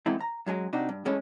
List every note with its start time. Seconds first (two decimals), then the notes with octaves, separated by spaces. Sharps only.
0.06 E3 G#3 A3 B3 C4 E4
0.20 A#5
0.46 F#2 F#3 G#3 G#4
0.73 C3 D4 D#4 F#4 G4
0.89 G2
1.05 A2 E3 G#3 A3 C#4 E4